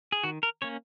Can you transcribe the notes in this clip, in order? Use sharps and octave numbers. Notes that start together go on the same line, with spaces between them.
G#4
D#3 F#4
A#4
A#3 C#4 C#5